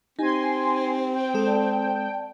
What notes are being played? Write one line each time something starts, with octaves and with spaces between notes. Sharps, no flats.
C4 D#4 G4 G#5 C6
G5
G#3 A4
D5 A5